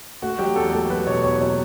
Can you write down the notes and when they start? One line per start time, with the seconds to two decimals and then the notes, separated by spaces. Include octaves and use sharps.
0.22 A3 F#4
0.39 F#3 G4
0.56 E2 A4
0.73 A3 A4
0.90 F#3 B4
1.07 B2 C#5
1.24 E2 C#5
1.41 F#3 C#5